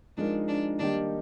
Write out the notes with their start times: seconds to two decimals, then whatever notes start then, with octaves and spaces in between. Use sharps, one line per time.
0.17 F3 G#3 D4 D#4 A#4
0.48 D4
0.79 D#3 G3 A#3 D4 D#4 G4